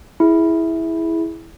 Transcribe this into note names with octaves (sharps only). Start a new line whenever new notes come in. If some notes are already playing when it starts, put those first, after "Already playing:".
E4 G#4